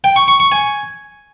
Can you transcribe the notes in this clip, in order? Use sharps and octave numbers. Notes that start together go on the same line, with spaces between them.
G5
C#6
C#6
C#6
G#5